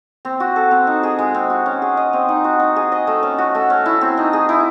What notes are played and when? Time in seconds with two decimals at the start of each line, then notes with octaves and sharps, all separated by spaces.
0.25 C4
0.40 F#4
0.56 A4
0.71 C4
0.87 D#4
1.03 G#4
1.19 G#3
1.35 C4
1.50 F#4
1.66 C#4
1.82 G#4
1.97 D#5
2.13 C4
2.29 D#4
2.44 F#4
2.60 D#4
2.76 G#4
2.92 D#5
3.07 A3
3.23 C#4
3.38 F#4
3.55 A3
3.70 C#4
3.86 E4
4.01 C4
4.18 D#4
4.33 G#4
4.49 E4